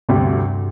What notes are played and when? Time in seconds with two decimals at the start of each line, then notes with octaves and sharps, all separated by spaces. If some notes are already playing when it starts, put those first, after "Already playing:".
0.09 D2 G2 C3 G3